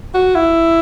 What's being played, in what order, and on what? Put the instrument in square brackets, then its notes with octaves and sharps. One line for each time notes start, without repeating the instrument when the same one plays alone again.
[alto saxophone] F#4
E4